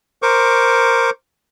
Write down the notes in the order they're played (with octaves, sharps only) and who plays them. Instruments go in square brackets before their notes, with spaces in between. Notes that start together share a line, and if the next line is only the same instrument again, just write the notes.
[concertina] A#4 C5 C#6 D6